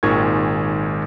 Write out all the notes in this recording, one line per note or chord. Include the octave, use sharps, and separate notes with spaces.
G#1 A#2 D#3 G#3 C#6 G#6